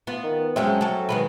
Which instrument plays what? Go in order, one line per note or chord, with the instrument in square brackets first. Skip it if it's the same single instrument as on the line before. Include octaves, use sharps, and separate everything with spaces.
[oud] B3 F4
[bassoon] D#3
[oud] F2 G#3 C#4 [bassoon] F#3 [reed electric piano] C5 E5 G5
[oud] C#4 A4
D#3 G#3 B4